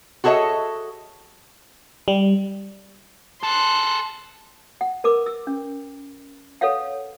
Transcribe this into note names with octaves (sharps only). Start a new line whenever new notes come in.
F#4 G#4 A4 C#5 D#5 E5
G3
G#4 A4 C6 F#6
F#5
A#4 B4 D6
E6
C#4
A4 B4 C#5 F5 F#5